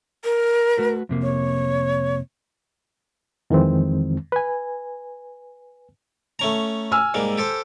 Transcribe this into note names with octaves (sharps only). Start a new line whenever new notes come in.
A#4
A3 F#4 B4
F2 C3 A#3
C#5
F2 D#3 E3 G#3 C4
B4 G#5
A3 C#4 A#5
G#5 E6 F6
G#2 G3 A#3
G4 A4 C5